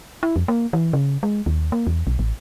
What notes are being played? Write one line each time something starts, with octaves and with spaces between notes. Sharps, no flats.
E4
F2
A#3
E3
C#3
G#3
D#2
A#3
E2
B1
A1